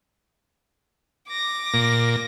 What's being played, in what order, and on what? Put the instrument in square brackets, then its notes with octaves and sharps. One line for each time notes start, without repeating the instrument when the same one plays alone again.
[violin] D6 A#6
[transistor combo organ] A#2